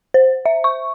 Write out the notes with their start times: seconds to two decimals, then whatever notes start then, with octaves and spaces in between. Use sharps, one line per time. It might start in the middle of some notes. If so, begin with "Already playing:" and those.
0.14 C5
0.46 E5
0.64 C#6